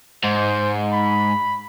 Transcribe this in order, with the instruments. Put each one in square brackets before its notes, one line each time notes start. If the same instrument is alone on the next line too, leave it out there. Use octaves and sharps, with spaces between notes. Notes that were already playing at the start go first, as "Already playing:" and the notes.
[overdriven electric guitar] G#2 [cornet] C5
[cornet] B5